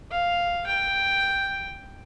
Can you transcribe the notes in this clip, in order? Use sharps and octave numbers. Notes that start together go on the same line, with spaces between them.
F5
G5